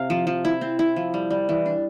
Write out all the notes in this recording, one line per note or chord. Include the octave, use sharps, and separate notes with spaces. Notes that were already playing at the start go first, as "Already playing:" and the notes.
Already playing: C3 F5
F3
F3
E4
C4
E4
F3
G3
G3
E3
D4